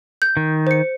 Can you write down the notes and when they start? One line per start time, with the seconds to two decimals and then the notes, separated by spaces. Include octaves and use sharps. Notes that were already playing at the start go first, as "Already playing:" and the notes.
0.22 G6
0.37 D#3
0.67 C5 C#7